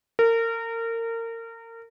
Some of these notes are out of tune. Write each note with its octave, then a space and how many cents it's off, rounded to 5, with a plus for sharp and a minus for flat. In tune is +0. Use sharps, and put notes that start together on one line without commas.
A#4 -30